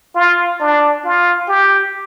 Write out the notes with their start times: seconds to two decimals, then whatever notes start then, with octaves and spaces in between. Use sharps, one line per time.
0.16 F4
0.61 D4
1.04 F4
1.48 G4